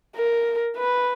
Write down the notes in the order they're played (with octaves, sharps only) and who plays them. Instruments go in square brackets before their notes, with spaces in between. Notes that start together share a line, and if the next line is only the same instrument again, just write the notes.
[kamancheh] A#4
B4